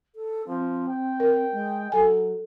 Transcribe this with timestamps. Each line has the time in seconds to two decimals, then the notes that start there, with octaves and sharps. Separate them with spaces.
0.15 A4
0.47 F3 C4
0.88 G5
1.20 A#4
1.52 G#3
1.92 F#3 A4 G#5